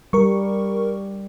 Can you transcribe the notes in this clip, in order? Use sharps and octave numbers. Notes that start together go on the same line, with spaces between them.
G3 A#4 C#6